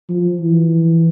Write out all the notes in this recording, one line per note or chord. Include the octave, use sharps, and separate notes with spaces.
F3
E3